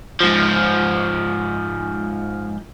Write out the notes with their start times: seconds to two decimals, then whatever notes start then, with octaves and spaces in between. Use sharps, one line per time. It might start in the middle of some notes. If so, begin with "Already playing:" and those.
0.21 G#2 F3